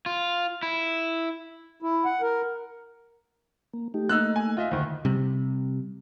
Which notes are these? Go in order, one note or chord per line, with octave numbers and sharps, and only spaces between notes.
F4
E4
E4
F#5
A#4
A#3
A3 D#4 G4
A3 A#3 D#4 E6 F#6
G#5
F4 D#5 E5
D2 D#3 C5 G5
C3 G3